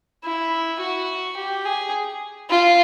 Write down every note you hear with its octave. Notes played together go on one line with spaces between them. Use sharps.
E4
F#4
G4
G#4
F4